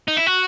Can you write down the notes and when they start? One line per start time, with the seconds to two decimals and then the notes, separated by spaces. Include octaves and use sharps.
0.08 D#4
0.17 E4
0.27 F#4